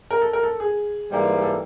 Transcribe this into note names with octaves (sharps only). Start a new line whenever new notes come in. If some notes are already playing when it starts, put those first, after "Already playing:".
A#4
A4
A#4
A4
G#4
G#2 E3 G3 A#3
A4